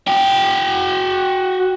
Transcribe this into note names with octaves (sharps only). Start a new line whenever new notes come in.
F#4 G5